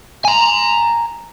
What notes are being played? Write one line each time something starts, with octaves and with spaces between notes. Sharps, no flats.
G#5 A#5